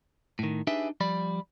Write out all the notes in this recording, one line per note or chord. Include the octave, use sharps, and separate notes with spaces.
A2 D#3
D4 D#4 G4 G#4 B4 E5
F3 G3 D5 B5